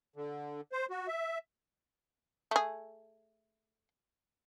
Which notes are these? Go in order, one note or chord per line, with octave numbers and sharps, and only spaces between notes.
D3
C5
F#4
E5
A3 G#4